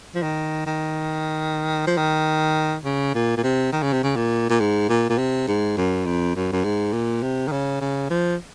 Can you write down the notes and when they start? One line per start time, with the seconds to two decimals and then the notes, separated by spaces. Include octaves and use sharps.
0.15 F3
0.22 D#3
0.66 D#3
1.87 F3
1.97 D#3
2.84 C#3
3.15 A#2
3.37 A#2
3.43 C3
3.72 D#3
3.82 C#3
3.93 C3
4.03 C#3
4.16 A#2
4.50 A#2
4.60 G#2
4.89 A#2
5.10 A#2
5.18 C3
5.47 G#2
5.77 F#2
6.06 F2
6.36 F#2
6.53 F#2
6.64 G#2
6.93 A#2
7.23 C3
7.48 D#3
7.52 C#3
7.81 C#3
8.10 F3